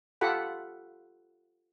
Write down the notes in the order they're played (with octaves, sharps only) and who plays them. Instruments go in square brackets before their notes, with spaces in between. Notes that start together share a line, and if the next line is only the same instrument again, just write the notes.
[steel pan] F4 G4 A4 F#5 B5